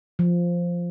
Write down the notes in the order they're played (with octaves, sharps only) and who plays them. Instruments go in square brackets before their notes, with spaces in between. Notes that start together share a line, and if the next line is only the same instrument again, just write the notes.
[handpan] F3